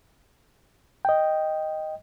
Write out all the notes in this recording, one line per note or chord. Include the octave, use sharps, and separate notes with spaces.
D#5 G5